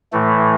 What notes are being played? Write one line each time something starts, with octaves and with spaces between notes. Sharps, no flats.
A2 E3 A3